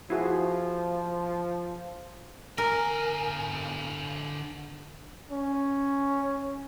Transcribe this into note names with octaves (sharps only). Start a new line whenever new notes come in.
F3 E4 F#4 G#4
D3 A#4 G#5
C#4